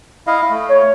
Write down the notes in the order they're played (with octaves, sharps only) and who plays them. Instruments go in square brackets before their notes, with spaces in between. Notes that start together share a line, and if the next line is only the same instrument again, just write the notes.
[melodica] E4 D#5 F5
A3
[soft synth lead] C#5